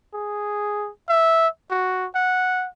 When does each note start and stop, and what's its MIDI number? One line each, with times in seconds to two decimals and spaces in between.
0.13 0.89 68
1.09 1.47 76
1.70 2.06 66
2.15 2.66 78